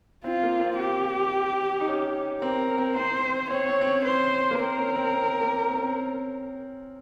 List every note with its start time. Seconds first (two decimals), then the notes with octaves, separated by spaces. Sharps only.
0.24 C4 F4
0.43 A#3
0.61 C4
0.79 G4
1.80 D#4
1.88 C#4
2.42 C4 A#4
2.78 C4
2.96 C4 C5
3.50 C4 C#5
3.69 C4
3.81 C4
3.87 C#4
4.05 C5
4.51 A#3
4.59 C4 A#4
4.78 C#4
4.96 C4
5.14 C4
5.41 A#3
5.68 C4
5.76 C#4
5.82 C4